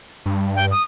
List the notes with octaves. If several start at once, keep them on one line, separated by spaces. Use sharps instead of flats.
G2
G5
D#6